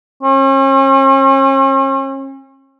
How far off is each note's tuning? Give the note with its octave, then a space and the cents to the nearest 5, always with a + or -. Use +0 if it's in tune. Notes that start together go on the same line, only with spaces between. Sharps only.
C#4 -40